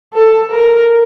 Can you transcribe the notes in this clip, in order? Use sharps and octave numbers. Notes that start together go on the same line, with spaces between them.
A4
A#4